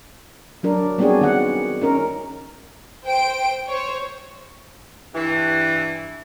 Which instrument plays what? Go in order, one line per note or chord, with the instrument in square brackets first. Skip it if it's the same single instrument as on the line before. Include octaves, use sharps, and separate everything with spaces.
[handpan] F#3 D4 A#4
G3 B3 C4 D4 F#4 G#4
D#3 B3 F#5
C#4 D#4 A#4
[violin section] C5 G5 D7
C5 C#5
[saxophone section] G2 E3